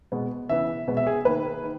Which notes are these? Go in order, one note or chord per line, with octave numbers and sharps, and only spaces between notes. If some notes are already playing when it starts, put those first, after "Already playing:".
B2 G#3 B3
C#3 E3 B3 E5
B2 G#3 B3
E5
G#4
D#3 A#3 B4
D#3